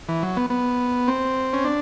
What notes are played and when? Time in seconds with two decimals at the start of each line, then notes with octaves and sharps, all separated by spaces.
0.08 E3
0.23 F#3
0.37 B3
0.50 B3
1.08 C4
1.53 C#4
1.65 D4